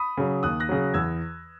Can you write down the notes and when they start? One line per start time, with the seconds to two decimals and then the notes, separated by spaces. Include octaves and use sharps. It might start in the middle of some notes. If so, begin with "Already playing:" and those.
Already playing: B5 D#6
0.18 C#3 F#3
0.43 D#2 D#6 F#6
0.60 F#6 A#6
0.69 C#3 F#3
0.94 E2 E6 G#6